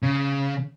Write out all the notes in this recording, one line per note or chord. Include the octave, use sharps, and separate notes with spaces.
C#3